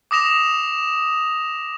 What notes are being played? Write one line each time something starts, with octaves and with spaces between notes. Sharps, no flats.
D6 D#6 A#6 E7 F7